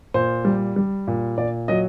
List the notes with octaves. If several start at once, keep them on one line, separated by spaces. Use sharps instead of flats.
A#2 C5
G3
G3
A#2
A#2 D5
F#3 D#5